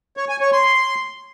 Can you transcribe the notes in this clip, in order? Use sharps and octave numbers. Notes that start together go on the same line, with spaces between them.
C#5
G#5
C#5
C6